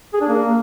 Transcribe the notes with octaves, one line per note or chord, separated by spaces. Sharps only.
G#4
D4
A#3